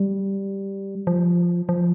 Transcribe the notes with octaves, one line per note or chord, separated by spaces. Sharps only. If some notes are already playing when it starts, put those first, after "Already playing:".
Already playing: G3
F3
F3